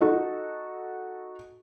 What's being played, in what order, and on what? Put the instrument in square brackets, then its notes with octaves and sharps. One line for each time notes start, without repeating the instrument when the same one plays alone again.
[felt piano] D#4 F#4 A4 D#5